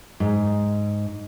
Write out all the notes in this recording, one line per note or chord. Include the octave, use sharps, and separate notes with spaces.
G#2